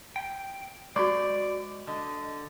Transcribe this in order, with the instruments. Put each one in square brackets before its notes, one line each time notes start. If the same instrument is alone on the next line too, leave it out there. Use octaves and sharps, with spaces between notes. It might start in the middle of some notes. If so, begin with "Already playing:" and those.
[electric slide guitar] G5
[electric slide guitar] G#3 C5 [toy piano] F#4 C#6 D6 [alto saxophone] D5
[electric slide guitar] D3 [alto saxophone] D#5